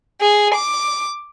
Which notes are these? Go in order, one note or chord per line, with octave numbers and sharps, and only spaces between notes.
G#4
D6